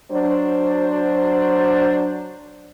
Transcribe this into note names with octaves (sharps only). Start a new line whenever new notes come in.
F#3 D4 C5